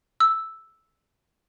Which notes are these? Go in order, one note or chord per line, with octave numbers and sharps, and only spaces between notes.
E6